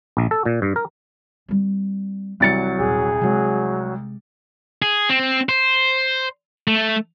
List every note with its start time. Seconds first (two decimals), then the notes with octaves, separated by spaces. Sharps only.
0.17 A#1
0.31 A4
0.45 A#2
0.62 G2
0.76 A#4
1.48 G3 C4
2.40 C2 E3 F#3 A6 C#7
2.80 D#1 G#4
3.21 C3 F#3 G#3
4.82 G#4
5.09 C4
5.49 C5
6.68 A3